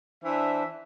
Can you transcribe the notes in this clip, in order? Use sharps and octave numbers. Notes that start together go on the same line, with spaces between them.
E3 D4 C5 E5